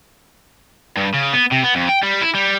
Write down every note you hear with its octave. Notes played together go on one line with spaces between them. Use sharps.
G2
C#3
B3
C3
B3
F2
G5
G3
E4
G3